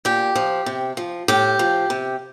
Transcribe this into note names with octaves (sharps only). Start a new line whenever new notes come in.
A#2 G4
F3
C3
F3
A2 G4
F3
C3